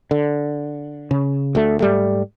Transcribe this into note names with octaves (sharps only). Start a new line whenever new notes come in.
D3
C#3
D2 A3
G#2 G3 A3